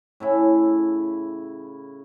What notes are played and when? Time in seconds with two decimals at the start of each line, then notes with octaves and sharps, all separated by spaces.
0.20 A2 C#3 E4